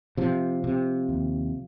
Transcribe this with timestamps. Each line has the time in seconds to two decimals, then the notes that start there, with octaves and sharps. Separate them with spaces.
0.17 C3 F3
0.64 C3
1.09 D#2